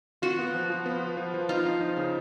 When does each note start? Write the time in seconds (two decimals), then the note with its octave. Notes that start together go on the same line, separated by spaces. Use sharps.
0.22 F4 F#4
0.39 B3
0.54 F3
0.70 F3
0.86 B3
1.02 F4
1.17 F3
1.34 F3
1.49 D#4 F4
1.65 D#4
1.81 D#4
1.97 C#3